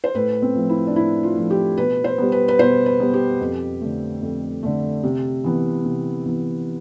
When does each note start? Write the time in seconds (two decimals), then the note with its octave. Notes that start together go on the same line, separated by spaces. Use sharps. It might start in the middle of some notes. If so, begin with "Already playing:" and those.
0.04 C5
0.15 A2 B4
0.42 C4
0.55 F3 A3
0.69 E4
0.87 D4
0.96 A2 E4
1.23 F4
1.36 F3 A3
1.50 G4
1.77 B2 B4
2.04 C5
2.18 G3 B3
2.32 B4
2.48 B4
2.59 B2 C5
2.86 B4
3.00 G3 B3
3.14 G4
3.41 F2
3.81 D3 A3
4.22 F2
4.63 D3 A3
5.04 C3
5.44 E3 B3
5.85 C3
6.25 E3 B3